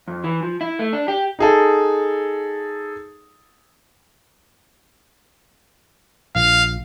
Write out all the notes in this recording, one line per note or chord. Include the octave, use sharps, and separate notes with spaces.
F2
E3
F3
E4
A3
D4
G4
D#4 G#4 A4
A#1 F5